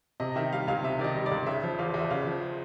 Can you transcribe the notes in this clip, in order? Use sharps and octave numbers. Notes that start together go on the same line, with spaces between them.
C3 D#5
D#3 E5
G3 F5
C#2 F5
C3 E5
D#3 D5
D#5
G3
D5
C#2
C#3 E5
F3
E2 F5
E2
E5
C#3 F5
F3